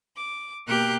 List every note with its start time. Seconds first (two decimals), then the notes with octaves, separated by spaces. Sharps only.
0.16 D6
0.67 B2 A#3 G4 A#4 F#6 G6